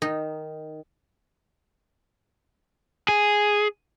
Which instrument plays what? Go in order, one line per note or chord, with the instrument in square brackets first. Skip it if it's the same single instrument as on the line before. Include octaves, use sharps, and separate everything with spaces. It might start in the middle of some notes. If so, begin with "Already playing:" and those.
[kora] D#3 [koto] D#4
[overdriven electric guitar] G#4